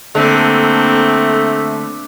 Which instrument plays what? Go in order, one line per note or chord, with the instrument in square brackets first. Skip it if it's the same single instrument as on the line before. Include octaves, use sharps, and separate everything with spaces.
[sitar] D3 [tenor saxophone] A3 [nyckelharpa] A#3 C4